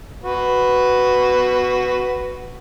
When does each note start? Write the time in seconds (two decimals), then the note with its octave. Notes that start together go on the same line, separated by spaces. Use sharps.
0.24 F#4 B4